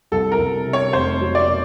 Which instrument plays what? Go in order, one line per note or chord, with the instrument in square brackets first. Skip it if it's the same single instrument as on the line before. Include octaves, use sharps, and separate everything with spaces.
[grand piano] C2 [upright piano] A4
[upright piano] A#4
[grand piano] C2
C3
[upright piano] C#5
[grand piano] F1 [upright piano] C5
[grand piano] F#3
[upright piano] D5
[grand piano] B2